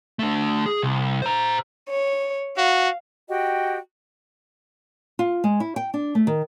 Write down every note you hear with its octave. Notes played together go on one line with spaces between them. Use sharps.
A3 D4
G#4
C2
C5 A#5
C#5
F#4 F5
F#4 G4 D#5 G5
F4
G#3
E4
G5
D4
A3
D#3